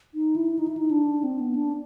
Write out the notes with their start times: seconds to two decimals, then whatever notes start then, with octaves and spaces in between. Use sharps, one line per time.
0.14 D#4
0.36 E4
0.59 D#4
0.68 E4
0.77 D#4
0.91 D4
1.24 C4
1.40 B3
1.55 D4